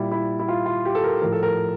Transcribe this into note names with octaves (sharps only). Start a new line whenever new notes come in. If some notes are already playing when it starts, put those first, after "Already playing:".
Already playing: A#2 G3 E4
E4
E4
F4
F4
G4
A4
A#4
A2 F3 A#4
A4
A#4